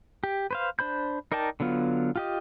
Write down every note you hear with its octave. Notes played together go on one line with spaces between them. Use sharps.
G4
B4 C5 F5
D4 C5 B5 G6
D#4 A#4 D5 G5 A5
D3 F#3 B3 F4
F4 G4 D#5